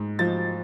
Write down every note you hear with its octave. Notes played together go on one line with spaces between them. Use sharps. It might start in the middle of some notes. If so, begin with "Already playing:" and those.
Already playing: G#2
F3 A6